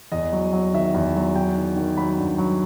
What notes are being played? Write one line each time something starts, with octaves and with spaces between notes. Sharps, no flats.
E2 D#5
F#3
F#3
D#3 E5
E2
F#3
F#3 G5
D#3
D#3
F#3 B5
G2
F#3